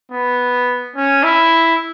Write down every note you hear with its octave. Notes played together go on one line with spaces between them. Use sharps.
B3
C#4
E4